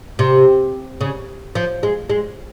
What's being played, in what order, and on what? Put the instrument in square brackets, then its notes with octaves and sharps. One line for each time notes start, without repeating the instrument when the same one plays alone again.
[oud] C3
C#3
F3
G#3
G#3